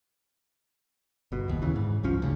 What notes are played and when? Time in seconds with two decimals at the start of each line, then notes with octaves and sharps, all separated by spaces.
1.32 G1 B2
1.48 F#1 D#2
1.62 C#3 E3
1.76 G#2
2.03 G1 C2 F3 C#4
2.22 D2 C#3